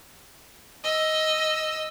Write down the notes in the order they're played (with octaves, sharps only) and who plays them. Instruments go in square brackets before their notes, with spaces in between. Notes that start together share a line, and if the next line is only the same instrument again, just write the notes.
[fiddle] D#5 E6